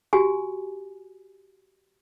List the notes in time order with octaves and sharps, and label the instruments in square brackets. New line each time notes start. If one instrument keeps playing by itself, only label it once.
[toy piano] F#4 G4 G#5